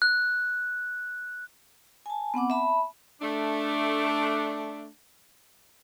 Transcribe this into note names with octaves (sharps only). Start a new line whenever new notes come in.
F#6
G#5 A5
B3 C4 F#5 D6
E5 A5 B5
A3 D4